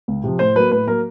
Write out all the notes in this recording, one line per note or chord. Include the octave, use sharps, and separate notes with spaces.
C#2
C3 F3
A2 C5
F#3 A#3 B4
A2 B4
F#3 A#3 A#4